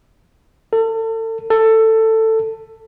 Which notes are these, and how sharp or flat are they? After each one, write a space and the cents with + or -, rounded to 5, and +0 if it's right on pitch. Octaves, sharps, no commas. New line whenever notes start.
A4 +35
A4 +15